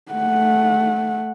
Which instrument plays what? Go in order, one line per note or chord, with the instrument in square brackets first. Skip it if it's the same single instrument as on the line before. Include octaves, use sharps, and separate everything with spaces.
[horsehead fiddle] A3 F#5